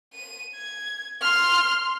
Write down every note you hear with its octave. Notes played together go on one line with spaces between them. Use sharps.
D#7
G#6
C6 F6